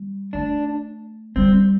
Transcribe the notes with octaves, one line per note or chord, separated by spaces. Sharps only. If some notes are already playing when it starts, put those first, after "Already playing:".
Already playing: G3
A3 D4
G3 C4